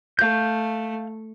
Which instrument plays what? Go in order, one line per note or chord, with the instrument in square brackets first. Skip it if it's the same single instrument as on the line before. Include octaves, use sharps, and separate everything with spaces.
[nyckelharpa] A3 [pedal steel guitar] F5 G6